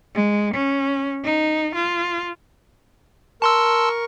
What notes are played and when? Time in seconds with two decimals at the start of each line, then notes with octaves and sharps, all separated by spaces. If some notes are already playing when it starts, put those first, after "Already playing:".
0.15 G#3
0.54 C#4
1.25 D#4
1.75 F4
3.42 A#4 A5 C6 C#6 E6